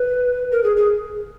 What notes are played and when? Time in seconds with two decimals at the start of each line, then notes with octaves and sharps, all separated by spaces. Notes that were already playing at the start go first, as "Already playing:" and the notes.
Already playing: B4
0.52 A#4
0.64 G#4
0.76 G#4